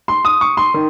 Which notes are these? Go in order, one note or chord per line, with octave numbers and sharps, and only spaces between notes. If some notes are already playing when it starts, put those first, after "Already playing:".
C6
D#6
C#6
C6
D#3